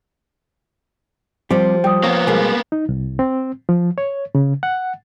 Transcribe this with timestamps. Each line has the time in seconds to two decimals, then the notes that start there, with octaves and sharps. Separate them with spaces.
1.51 F3 G3 C4 G4
1.84 G3 G5 D#6
2.04 A#3 B3 C#5
2.27 B2 G3 G#3 A#4 G#5
2.72 D#4
2.89 C2
3.19 C4
3.69 F3
3.98 C#5
4.35 C#3
4.63 F#5